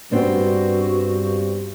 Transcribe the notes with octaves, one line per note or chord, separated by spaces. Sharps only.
G2 B3 C4 D4 F#4